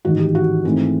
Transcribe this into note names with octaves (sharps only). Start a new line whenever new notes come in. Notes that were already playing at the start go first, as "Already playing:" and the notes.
A1 G#2 D#3 F#4
G4
F#4
G#2 E3 A3 C4